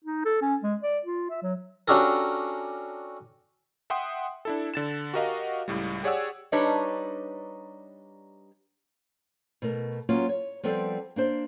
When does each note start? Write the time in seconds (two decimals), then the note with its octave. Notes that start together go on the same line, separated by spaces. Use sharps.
0.04 D#4
0.25 A4
0.42 C#4
0.62 G#3
0.83 D5
1.05 F4
1.30 E5
1.42 F#3
1.88 C#4 D4 F#4 G4 A4 A#4
3.90 E5 F#5 G5 C6 D#6
4.45 D4 E4 A4
4.74 D3 A6 E7
5.14 F#4 G4 A#4 D#5 F5 F#5
5.68 C#2 A2 G3
6.03 G4 G#4 C#5 D5 F#5 E6
6.52 G3 D4 D#4 B4 C#5
9.62 B2 A3 A#4
10.09 F#3 A#3 B3 C#4 F4 F#4
10.29 C#5
10.63 F3 G3 B3 C4 A4 D5
11.16 A#3 D4 C5